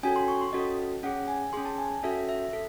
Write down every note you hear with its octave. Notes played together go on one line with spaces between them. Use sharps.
C#4 F#4 A4 G#5
C6
C#6
C6
C#4 F#4 A4 D#5
C#4 G#4 F#5
G#5
C#4 G#4 C6
A5
G#5
C#4 F#4 A4 E5
E5
A4